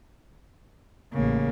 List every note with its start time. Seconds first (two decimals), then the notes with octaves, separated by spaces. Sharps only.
1.14 A1 C#3 A#3